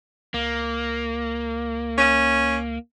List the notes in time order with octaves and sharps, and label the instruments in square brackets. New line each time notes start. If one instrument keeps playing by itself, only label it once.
[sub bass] C#2 [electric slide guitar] A#3
[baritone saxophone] C#4